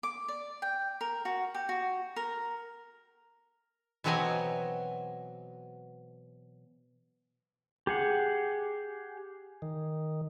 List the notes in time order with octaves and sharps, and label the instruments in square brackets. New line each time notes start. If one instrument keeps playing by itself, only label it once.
[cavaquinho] D6
D5
G5
A#4
F#4
G4
F#4
A#4
[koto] B2 E3 F#3 C4 D#5 G#5
[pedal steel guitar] G4 G#4 F#5
[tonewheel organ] D#3